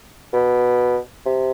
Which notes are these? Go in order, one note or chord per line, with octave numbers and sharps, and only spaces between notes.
B2
C3